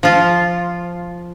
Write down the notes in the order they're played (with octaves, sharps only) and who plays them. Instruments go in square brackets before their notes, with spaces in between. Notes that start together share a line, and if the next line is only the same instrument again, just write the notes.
[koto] F3 F4